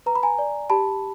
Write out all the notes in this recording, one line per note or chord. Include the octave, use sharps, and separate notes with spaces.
B4 A#5
B5
G#5 A#5
D5
G4 A5 B5